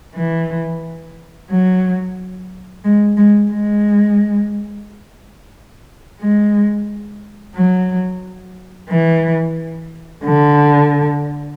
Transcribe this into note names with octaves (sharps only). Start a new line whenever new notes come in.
E3
F#3
G#3
G#3
G#3
G#3
F#3
E3
D3